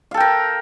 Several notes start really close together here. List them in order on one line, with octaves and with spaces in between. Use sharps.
F5 A4 G5 A#4